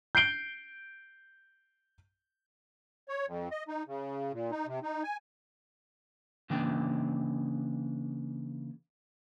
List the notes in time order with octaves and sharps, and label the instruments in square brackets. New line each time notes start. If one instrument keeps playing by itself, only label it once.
[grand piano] G6 C7 D7 G7
[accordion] C#5
F2
D#5
D#4
C#3
A#2
D#4
C3
D#4
G#5
[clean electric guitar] C#3 E3 A#3 D4 G5